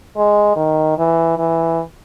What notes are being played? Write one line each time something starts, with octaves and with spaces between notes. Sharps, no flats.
G#3
D#3
E3
E3